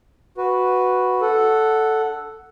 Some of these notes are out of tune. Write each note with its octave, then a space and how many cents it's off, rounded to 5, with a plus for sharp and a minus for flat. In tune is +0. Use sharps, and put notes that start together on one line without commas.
F#4 +0 B4 +0
D4 +0 A4 +0 F#5 +0